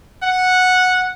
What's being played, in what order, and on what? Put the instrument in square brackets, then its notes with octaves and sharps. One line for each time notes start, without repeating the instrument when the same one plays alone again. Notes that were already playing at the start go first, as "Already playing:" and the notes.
[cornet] F#5